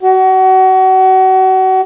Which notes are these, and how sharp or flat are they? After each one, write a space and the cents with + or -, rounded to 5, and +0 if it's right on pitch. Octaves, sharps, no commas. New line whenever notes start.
F#4 +30